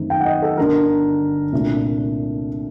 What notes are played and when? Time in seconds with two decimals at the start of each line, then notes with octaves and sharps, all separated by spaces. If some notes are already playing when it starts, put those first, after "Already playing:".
Already playing: F#2 D#3 A3 C4 D#4
0.10 G5
0.20 F#5
0.26 D#5
0.42 A4
0.57 G1 G2 D3 G3 D4 A#4
1.52 C2 A#2 A3 D4